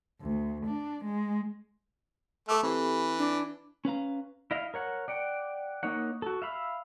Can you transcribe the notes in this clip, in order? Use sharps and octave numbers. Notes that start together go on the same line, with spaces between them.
D2
D4
G#3
A3 A4 D6 E6
E3 C4 G4 A4
D4
C#4 B4 F5 A#5
E4 D#5 F5
A#4 C#5 F#5
D5 F#5 G5
A#3 D#4 C#5 F#5
F#4 A4
E5 F5 B5 E6